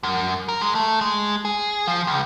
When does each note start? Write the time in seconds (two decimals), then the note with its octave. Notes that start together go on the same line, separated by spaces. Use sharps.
0.03 F#2
0.49 A#4
0.61 G#3
0.75 A3
1.01 G#3
1.45 G#4
1.87 F3
2.07 C#2